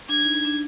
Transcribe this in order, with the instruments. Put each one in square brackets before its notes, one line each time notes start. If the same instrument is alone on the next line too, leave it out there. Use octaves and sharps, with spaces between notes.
[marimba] D4 [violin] G#6
[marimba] D#4
D4
D4